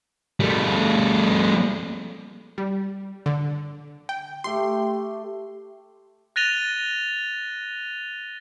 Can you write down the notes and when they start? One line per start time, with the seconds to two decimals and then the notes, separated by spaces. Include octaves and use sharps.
0.40 G3 A3
2.58 G3
3.26 D3
4.09 G5
4.44 A3 G4 C6
6.36 F#6 A6 A#6 D#7 F7 G7